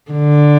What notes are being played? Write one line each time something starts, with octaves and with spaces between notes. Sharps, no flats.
D3